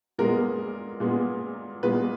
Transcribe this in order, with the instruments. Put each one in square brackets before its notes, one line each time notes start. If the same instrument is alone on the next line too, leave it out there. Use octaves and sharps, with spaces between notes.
[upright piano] A#2 G#3 B3 A#4
A#2 G#3 B3
A#2 G#3 B3 B4